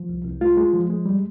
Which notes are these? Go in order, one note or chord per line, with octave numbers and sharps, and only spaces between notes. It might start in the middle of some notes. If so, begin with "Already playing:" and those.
Already playing: F3
C2
C2
G#3 F4
G#3
F3
G#3
G3